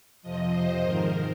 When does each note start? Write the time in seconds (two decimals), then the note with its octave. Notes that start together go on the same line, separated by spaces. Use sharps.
0.22 F2 C3 F3 D#5
0.53 C5
0.82 G#2 D#3 A#4